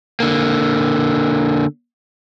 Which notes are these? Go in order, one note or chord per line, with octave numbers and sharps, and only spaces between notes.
D3 A#3